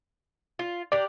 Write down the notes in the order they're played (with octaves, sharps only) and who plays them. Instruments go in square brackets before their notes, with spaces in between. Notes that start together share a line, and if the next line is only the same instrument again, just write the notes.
[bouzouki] F4
[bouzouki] D4 G4 A#4 [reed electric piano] D5